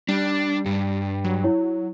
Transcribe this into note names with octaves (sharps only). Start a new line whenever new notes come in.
G3 D4
G2
F#3
E4 C#5